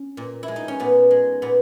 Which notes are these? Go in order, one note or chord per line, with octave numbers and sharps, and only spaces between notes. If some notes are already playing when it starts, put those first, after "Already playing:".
Already playing: C#4 F#4
A#2
E4
G#3
D#4
C#4
A#2 B3
G#3
A#2 B3